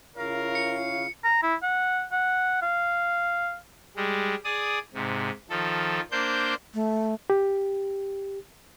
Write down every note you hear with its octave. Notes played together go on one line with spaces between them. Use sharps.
C#3 E4 F4 A#4 C#5 F5
C#7
A#5
E4
F#5
F#5
F5
G3 G#3
G#4 D5 D#6
G#2 C3
D#3 F3 A4
A#3 D4 C5 G6
A3
G4